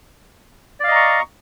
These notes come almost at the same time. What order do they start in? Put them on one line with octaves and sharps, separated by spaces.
D5 F5 D#5 A#5 C#6